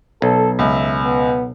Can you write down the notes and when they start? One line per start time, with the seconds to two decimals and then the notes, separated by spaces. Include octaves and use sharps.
0.22 B1 A4
0.59 C#2 E5
1.04 B3